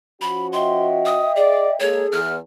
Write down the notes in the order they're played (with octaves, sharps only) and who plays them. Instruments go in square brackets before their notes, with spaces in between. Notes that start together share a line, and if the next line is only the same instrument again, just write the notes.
[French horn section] F3 C#4 F#4 [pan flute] B5
[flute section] D#5 E5 G5 [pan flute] C6
[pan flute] D#6
[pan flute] G#4 [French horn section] D5
[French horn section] G#3 A#3 [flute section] G#4 A4 [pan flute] C#5
[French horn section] E2 [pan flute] F6